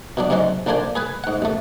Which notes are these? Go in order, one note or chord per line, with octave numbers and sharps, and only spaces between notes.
B2 F#3 D4
G#2 C3 F#3 G#3 C#4
A#1 D3 A#3 D4 C5 G#5
G#4 B4 G#5
G#2 F#5
A1 A3